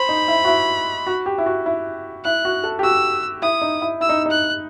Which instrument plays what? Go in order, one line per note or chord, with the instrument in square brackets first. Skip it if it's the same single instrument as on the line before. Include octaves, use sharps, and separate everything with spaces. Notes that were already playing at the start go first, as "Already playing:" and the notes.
Already playing: [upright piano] C5 [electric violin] B5
[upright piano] D#4
E4
F#4
E4
F#4
G4
E4
F#4
E4
[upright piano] E4 [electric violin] F#6
[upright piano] F#4
A4
G4
[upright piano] F#4 [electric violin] E6
[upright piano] E4 [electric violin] D#6
[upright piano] D#4
E4
[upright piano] E4 [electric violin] E6
[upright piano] D#4
[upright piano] D#4 [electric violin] F#6